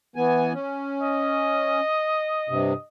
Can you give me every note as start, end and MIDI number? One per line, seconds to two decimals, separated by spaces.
0.16 0.53 52
0.16 0.53 59
0.16 0.53 80
0.53 1.80 61
1.02 2.87 75
2.49 2.73 43
2.49 2.73 48